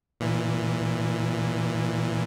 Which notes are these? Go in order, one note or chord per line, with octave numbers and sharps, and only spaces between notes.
A#2 E3